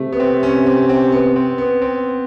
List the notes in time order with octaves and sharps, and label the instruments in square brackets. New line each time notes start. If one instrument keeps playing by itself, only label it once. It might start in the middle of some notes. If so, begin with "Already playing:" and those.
Already playing: [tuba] C3 [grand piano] A3
[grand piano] B3
C4
C#4
C4
C4
B3
C4
B3
C4